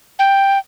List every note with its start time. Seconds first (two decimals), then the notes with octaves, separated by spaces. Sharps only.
0.19 G5